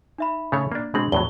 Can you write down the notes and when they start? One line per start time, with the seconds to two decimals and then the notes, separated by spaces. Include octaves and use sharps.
0.18 D#4 E5 B5
0.52 C#3 A3 C#5
0.72 A#3 D4
0.94 B2 G#3 C4 D4 F#7
1.12 E2 A2 F#3 G7